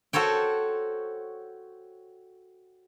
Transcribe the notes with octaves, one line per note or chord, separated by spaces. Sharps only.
F#4 A4 C5 C#5 G5